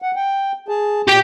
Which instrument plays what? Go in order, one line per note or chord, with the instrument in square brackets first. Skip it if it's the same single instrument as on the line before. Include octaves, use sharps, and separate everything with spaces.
[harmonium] F#5
G5
G#4 A5
[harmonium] A#2 [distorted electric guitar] G4 G5